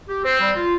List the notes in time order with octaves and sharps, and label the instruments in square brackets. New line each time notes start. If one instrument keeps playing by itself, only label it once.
[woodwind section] G4
[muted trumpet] C4 [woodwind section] C5
[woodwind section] G3
F4